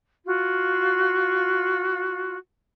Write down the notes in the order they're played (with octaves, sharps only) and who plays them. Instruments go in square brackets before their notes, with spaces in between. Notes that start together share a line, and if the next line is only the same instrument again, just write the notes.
[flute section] F4 F#4